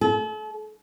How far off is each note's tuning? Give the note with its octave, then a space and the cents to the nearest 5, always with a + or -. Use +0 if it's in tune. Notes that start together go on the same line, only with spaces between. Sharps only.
A4 -40